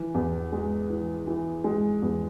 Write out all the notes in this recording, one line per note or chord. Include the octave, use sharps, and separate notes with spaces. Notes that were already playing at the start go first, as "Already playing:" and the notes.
Already playing: E3
E2
G#3
E3
E3
G#3
E2